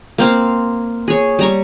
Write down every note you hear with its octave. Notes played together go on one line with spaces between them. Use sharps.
A#3 C4 F5
G#4 C#5
G3 A#5 C#6